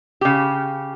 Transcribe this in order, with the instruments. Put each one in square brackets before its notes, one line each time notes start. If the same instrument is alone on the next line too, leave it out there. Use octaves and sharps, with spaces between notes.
[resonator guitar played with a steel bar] C#3 G4